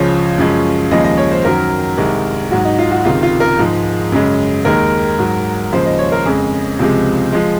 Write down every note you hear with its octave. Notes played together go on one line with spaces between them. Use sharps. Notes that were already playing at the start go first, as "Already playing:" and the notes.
Already playing: C#2 C#3 F3 C#5
F#2 C#3 F3 G#3
D#2 C#3 F3 G#3 D#5
D#5
C#5
C5
F#2 D#3 F#3 A#4
C2 C3 D#3 G#3
G#2 F#3 F#4
D#4
F4
F#4
C#2 C3 D#3 F4
F4
A#4
G#2 F3 G#3
F#2 C#3 G#3
D#2 D#3 G#3 A#4
G#2 F#3
D#2 C#3 F3 G#3 C5
D#5
C#5
A#4
F2 C#3 G#3 G#4
C#2 C3 F3 G#3
F3 G#3